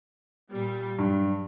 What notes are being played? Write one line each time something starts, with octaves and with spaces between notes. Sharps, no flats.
A#2 G3
G2 F#3